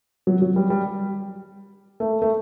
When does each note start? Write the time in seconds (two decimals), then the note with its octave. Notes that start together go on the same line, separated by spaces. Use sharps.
0.27 F#3
0.42 F#3
0.56 G3
0.70 G3
2.00 A3
2.22 A3